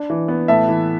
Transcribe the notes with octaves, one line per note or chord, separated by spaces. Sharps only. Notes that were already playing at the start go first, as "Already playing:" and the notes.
Already playing: D4
E3
B3
A2 E5 A5
E3